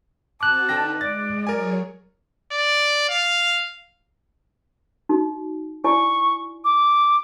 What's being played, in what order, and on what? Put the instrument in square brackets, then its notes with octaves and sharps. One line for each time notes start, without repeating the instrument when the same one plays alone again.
[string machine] C4 F#4 [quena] A5 [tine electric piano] D6 F#6
[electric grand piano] D3 G5 A#6 [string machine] D#4 B4
[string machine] G#3 [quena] D5 [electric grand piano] A6
[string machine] F#3 G#4 C#5 [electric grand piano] A#4 G#5
[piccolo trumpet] D5
F5
[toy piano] D#4 F#4
[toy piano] E4 D5 G#5 [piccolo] C#6
[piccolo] D6